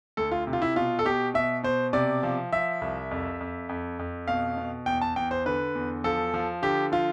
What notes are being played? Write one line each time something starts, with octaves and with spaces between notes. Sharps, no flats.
D2 A4
F4
C3
F4
E4
B2 F4
A4
B2 G4
B2 E5
B2 C5
C3 D5
F3
F3 E5
C2
F2
F2
F2
F2
B2 F5
B2
E2 G5
A5
E2 G5
C5
D3 B4
E2
F3 A4
F3
D3 G4
F3 F4